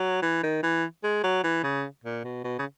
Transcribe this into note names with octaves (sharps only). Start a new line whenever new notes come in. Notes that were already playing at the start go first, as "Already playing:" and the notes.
Already playing: F#3
E3
D#3
E3
G#3
F#3
E3
C#3
A#2
B2
B2
C#3